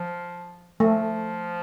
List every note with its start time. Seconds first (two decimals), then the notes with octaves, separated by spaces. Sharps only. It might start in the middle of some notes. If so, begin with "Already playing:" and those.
Already playing: F3
0.80 F3 A3